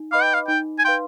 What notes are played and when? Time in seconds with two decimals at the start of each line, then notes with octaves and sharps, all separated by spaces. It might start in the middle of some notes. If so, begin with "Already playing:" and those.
Already playing: D#4
0.12 B4 D#5 F5 B5 D6
0.22 G5
0.34 F5
0.48 D#4 G5
0.79 G#5
0.85 B4 F5 G5 C6